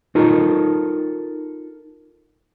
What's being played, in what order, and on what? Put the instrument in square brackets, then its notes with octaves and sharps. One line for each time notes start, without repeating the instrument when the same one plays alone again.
[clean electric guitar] D#4 F4 A4 A#4 A#5